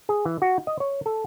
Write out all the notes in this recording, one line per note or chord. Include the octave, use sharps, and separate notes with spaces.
G#4
E3
F#4
D#5
C#5
A4